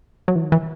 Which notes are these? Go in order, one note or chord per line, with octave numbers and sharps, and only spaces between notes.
F#3
E3
D#3
E3